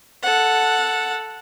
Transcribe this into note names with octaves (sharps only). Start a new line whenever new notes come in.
A4 F#5